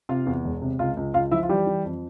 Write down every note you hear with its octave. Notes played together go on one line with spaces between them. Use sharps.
C3 F4 F5
E2
E1
C3
C#2 F4 F5
C#2
C#2 F4 F5
F3 E4 E5
F4
E3 G3 G4
E3
F2